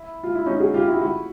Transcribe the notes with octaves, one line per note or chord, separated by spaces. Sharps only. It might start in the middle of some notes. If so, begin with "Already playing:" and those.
Already playing: E4
F4
E4
C#4 D#4
F#4 G#4
F4 G4
E4 F#4
E4 F#4